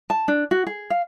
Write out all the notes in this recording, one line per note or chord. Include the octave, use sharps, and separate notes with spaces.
A5
D4
F#4
G#4
F5